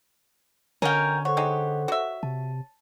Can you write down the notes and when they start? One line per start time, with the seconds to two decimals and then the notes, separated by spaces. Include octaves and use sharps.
0.82 B2 D3 C#4 A#4 G5
1.25 A4 C5 C#5 F#5
1.37 G#3 D#4 G4
1.88 F#4 E5
2.23 C3 A5